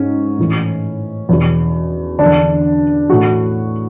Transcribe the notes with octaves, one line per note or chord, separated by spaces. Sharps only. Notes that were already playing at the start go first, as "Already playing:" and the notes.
Already playing: G#2 C#4
A2 E3
E2 B2
D3 D4
E2
A2 E3 F#4